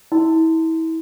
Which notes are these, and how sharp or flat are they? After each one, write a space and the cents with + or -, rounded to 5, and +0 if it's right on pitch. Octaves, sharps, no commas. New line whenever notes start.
E4 -30 C6 -15